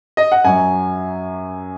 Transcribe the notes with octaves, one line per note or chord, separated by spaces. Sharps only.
D#5
F#5
F#2 F#3 G#5